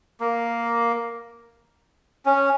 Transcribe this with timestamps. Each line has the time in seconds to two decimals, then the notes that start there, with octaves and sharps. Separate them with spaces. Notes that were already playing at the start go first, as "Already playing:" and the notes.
0.20 A#3
2.25 C#4